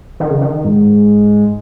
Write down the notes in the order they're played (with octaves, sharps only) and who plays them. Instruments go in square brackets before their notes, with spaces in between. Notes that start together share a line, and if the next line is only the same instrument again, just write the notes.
[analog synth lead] D#3
C#3
D#3
G#2